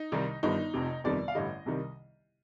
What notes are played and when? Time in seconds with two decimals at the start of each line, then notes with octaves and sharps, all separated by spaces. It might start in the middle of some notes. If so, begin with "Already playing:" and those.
Already playing: D#4
0.12 C2 C3 D#3 G3
0.43 G1 G2 D#3 G3 D#4
0.74 F1 F2 C3
1.04 G1 F2 C3 D#3 G3 D5
1.28 F5
1.35 A1 G2 D3 G3 D#5
1.66 C2 C3 D#3 G3